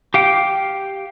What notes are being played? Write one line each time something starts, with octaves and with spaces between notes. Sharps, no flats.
G4 F5 G5